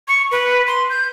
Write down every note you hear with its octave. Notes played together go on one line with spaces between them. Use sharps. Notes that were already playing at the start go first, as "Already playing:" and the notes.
C#6
B4
C6
G6